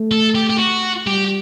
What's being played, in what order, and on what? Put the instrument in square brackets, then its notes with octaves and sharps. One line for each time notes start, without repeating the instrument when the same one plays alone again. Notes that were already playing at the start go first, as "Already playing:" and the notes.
Already playing: [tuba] A3
[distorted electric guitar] A4
G4
G4
F#4
[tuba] G3 [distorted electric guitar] G4